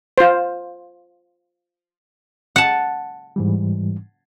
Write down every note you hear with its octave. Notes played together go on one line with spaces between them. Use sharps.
F4 C5
F#5 A5
G#2 E3 G3